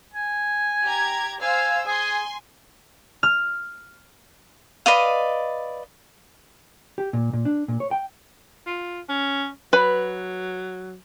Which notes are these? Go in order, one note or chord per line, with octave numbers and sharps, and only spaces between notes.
G#5
G4 A#5 G#6
C5 F5 G#5 E6
G#4 G#5 C6
F6
B4 D5 D#5 F5
G4
A#2
A#2
D4
A#2
C#5
G5
F4
C#4
F#3 B4 B5